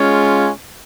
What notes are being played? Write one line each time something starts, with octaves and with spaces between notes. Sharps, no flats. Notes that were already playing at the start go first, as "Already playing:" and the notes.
Already playing: G#3 C#4 F4